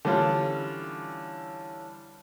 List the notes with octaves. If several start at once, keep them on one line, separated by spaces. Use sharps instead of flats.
D3 E3 G3 C#4 F4